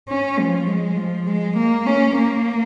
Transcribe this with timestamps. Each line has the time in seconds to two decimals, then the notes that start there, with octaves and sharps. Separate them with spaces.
0.08 C#4
0.39 F3
0.67 G#3
0.97 F3
1.27 G#3
1.57 A#3
1.86 C#4
2.17 A#3